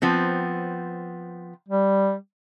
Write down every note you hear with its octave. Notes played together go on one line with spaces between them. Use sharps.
F3 B3 C4
G3